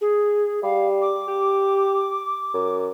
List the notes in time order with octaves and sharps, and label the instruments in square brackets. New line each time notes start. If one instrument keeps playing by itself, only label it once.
[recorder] G#4
[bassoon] G3 [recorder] F5
[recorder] D6
[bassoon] G4
F#2